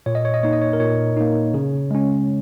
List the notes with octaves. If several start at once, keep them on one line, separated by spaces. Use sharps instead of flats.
A#2 C#5
D#5
C#5
D#5
A#3 D#4 C#5
D#5
C#5
A#4
A#2 C#5
A#3 D#4
C#3
G#3 C#4